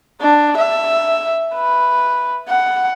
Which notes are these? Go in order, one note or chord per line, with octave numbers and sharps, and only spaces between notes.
D4
E5
B4
F#5